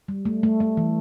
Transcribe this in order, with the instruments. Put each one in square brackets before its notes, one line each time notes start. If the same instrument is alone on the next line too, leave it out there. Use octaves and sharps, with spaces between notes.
[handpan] G3
A3
A3
A3
E3